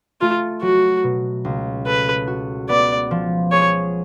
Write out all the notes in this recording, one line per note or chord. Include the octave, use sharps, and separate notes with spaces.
A3 F4
F#3 F#4
B2
C#2
A4 B4
F#4
B3 D5
F3
G#4 C#5